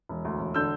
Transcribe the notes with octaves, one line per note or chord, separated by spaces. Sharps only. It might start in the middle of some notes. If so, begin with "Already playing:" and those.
E1
D2
E1
D3 E6 G6